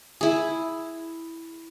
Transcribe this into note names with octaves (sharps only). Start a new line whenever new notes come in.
E4 G#4